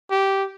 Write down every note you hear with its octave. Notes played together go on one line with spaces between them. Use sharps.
G4